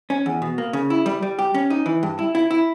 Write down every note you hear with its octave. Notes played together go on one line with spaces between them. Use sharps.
C#4
E2
B2
A#3
C#3
E4
G3
G3
G4
C#4
D#4
E3
G2
E4
E4
E4